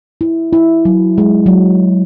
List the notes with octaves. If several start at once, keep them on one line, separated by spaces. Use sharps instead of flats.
E4
E4
F#3
G#3
F#3